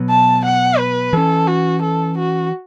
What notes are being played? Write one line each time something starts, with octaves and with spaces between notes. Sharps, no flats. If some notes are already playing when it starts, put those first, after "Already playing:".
Already playing: B2 F#3 B3
A5
F#5
B4
E3 C#4 A4
F#4
A4
F#4